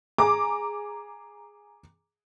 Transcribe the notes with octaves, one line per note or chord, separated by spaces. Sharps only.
G#4 A#5 D6